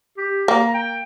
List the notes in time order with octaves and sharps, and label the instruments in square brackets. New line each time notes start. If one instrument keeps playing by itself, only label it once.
[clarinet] G4
[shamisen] A#3 [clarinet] A#5
[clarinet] G5